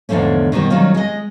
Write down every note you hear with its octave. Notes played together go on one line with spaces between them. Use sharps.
E2 G#2 D3 F3 A3 C#4
B2 D#3 G3 C4
D#3 F#3 G3 C4 C#4 F4
G#3 D#5